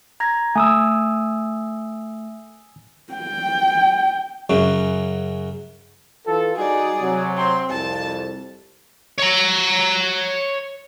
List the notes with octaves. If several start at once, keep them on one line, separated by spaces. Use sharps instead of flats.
A#5 G#6 A#6
A3 G#5 D#6 E6
G5
F#2 C#3 F#3
E3 F4 A4
G3 D#4 F#4 G#4 D5
C3 F#3
C4 C6
C2 F2 A5
C#5 A#5